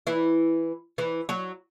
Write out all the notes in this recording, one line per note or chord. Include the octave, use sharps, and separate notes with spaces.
E3 E4
E3 E4
F#3 F#4